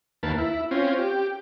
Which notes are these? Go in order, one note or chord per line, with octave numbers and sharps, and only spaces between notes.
D#2 A#3 B4 A5
E4
C4 C#4 F4
G4